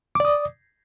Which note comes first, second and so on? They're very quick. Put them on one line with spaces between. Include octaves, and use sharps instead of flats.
D6 D5 D#6